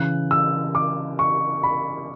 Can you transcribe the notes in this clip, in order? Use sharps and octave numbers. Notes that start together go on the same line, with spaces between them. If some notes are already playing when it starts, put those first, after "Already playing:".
Already playing: C#3 E3 F#6
E6
D6
C#6
B5